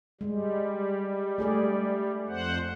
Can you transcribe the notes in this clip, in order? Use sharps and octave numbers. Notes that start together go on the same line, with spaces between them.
G3 G#3
A3 G#4 D5
F2 C5 F#5